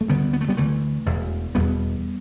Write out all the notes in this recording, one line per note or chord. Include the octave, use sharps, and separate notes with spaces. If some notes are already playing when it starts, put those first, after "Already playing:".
A3
D2 D3 G3 B3
B3
A3
G3 B3
D2 D3 E3 A3
E1 E2 B2
E1 E2 B2 G3 B3